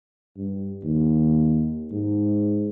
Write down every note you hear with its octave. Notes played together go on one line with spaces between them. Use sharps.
G2
D#2
G#2